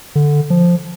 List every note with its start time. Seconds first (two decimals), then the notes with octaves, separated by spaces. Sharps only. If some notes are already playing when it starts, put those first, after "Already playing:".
0.15 D3
0.50 F3